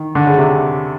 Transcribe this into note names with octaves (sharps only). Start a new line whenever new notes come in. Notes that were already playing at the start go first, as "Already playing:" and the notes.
Already playing: D#3
D3
C#3
C3